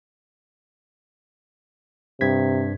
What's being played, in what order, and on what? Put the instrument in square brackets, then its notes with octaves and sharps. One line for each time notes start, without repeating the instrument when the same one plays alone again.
[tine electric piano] G2 G#6 B6 [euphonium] C3